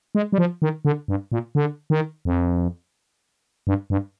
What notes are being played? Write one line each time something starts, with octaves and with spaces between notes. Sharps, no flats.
G#3
G3
F3
D#3
D3
G2
A#2
D3
D#3
F2
G2
G2